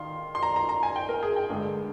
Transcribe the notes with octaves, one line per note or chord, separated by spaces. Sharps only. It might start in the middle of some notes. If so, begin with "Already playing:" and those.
Already playing: D#3 F5 C6
C6
A#5
A#5
A#5
G#5
G5
A#4
G#4
G5
G2 D3 G#3